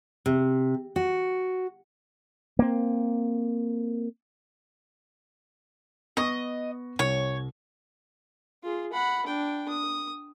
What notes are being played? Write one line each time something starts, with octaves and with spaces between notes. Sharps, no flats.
C3
F#4
A#3 C4
B3 D#5 C#6 A#6
C2 C#5
F4 G#4
F#5 B5
D4 G5
D#6